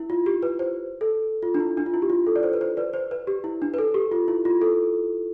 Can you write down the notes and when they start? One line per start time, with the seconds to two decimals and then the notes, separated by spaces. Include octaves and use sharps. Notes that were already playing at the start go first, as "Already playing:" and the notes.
Already playing: E4
0.10 F4
0.26 G4
0.43 B4
0.59 C5
1.01 A4
1.43 F4
1.54 D4
1.60 E4
1.77 D4
1.86 F4
1.94 E4
2.02 G4
2.10 F4
2.27 A4
2.36 D5
2.43 C5
2.53 B4
2.61 C5
2.77 B4 D5
2.93 C5
3.11 B4
3.27 G4
3.44 E4
3.62 D4
3.74 B4
3.78 A4
3.94 G4
4.11 F4
4.28 E4
4.45 F4
4.62 A4